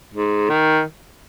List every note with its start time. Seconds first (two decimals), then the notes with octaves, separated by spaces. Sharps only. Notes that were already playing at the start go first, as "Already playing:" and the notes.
0.14 G#2
0.49 D#3